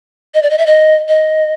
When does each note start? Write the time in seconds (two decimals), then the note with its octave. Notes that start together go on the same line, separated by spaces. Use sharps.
0.34 D#5
0.43 D5
0.50 D#5
0.58 E5
0.67 D#5
1.09 D#5